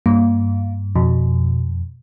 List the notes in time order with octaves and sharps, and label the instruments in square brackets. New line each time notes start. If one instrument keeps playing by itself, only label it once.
[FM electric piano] G2 [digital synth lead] A#3
[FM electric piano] F2 [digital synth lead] B2